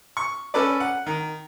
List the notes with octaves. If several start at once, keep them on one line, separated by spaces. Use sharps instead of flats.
C#6
C#4 A4 B4 D5
F#5
D#3